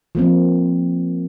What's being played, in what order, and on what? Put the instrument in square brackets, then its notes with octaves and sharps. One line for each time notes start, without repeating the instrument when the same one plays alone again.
[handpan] F3 A#3 C4